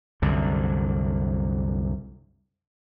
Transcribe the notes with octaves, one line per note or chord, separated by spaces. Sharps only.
C2 F#2 D3